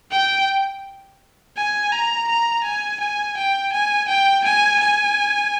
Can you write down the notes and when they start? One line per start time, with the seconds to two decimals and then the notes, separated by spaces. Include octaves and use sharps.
0.12 G5
1.57 G#5
1.92 A#5
2.28 A#5
2.64 G#5
3.00 G#5
3.37 G5
3.73 G#5
4.08 G5
4.44 G#5
4.80 G#5